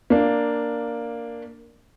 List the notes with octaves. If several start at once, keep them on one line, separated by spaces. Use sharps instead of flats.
A#3 D4